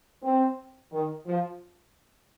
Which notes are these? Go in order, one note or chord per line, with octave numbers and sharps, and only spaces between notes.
C4
D#3
F3